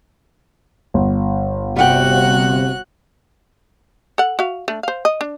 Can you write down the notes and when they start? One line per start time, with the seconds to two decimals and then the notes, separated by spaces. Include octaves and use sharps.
0.94 G1
1.76 C3 G3 F#4 F#5 G5 F#6
4.18 A4 F#5
4.39 F#4 E5 F5
4.68 A3 D4
4.83 C5 F5
5.05 D#5
5.21 D4